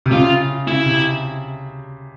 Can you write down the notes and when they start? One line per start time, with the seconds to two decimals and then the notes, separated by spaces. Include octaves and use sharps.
0.06 C3
0.12 C#3 F4
0.68 C#3 E4
0.86 C3